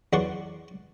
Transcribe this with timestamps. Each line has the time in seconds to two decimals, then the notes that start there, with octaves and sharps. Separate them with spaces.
0.13 E2 F#3 D5 F#5 C6 C#6